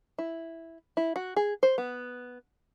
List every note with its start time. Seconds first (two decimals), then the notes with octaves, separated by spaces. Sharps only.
0.18 E4
0.97 E4
1.16 F#4
1.36 G#4
1.63 C5
1.78 B3